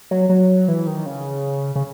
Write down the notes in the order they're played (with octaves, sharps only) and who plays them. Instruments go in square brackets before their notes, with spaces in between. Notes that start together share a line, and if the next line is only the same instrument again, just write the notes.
[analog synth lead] F#3
F#3
E3
D#3
C#3
C#3